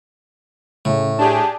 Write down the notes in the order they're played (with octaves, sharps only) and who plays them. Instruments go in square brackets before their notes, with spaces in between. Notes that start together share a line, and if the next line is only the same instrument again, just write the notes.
[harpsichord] A2 [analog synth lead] C#3
[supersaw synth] D4 G4 G#4 [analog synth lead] A5